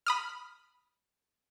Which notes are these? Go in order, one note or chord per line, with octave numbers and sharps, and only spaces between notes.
B5 D#6 F6